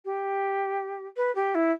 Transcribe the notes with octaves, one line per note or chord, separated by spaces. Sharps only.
G4
B4
G4
E4